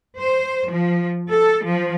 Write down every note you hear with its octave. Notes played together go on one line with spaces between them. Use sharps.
C5
F3
A4
F3